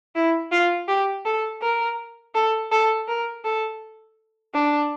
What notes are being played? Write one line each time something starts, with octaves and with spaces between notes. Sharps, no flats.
E4
F4
G4
A4
A#4
A4
A4
A#4
A4
D4